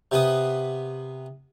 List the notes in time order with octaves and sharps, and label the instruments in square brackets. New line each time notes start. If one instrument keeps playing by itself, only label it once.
[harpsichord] C3 B3 B4 D#6